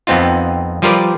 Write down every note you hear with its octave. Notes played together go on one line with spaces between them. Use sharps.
F2 B3 C4 D#4 F4
F3 G3 F4 A#4 B4 D5